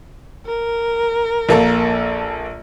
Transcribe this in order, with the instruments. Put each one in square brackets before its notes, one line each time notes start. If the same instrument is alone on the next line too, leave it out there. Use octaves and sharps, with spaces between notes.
[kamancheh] A#4
[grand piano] A#1 A#3 A4